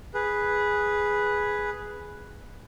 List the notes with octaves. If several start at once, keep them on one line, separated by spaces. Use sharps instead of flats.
G#4 B4